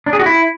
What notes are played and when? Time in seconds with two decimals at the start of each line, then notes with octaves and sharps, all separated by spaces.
0.06 D4
0.13 G#4
0.19 F#4
0.26 E4